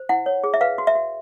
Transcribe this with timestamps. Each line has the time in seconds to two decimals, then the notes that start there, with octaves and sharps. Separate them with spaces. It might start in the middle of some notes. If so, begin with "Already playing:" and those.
Already playing: C5
0.09 E4 F#5
0.26 C#5
0.44 G#4
0.54 E5
0.61 B4 F5
0.78 F#4
0.87 E5
0.95 F#4